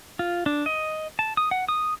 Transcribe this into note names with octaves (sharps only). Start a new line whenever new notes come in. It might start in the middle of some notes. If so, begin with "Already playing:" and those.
F4
D4
D#5
A5
D#6
F#5
D#6